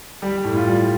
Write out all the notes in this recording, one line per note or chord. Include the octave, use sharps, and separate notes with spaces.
G3 G4
A2
F4
G3